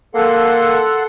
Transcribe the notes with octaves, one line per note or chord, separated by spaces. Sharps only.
A#3 A4 F#5 C6